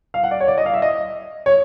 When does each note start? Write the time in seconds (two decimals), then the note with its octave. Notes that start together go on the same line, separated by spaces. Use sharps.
0.14 F5
0.23 F#5
0.31 D5
0.40 C#5
0.48 D5
0.58 D#5
0.66 F5
0.74 E5
0.82 D#5
1.46 C#5